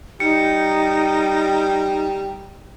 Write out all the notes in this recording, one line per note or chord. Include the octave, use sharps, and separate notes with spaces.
G3 D#4 C#7